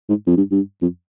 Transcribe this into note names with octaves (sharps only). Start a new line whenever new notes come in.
G#2
F2
G2
G2
F2